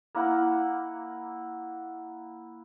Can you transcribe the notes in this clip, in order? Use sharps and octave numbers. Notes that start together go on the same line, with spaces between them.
A#3 E4 F#5